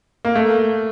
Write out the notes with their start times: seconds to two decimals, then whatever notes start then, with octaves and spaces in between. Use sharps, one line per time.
0.25 A#3
0.35 A3